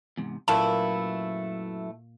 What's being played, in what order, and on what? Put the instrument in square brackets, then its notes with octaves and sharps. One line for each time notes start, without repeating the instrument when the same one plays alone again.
[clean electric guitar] E2 G#2 C3
[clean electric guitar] F#2 F#3 B4 [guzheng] A#2 [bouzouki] A3 E4 [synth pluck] A5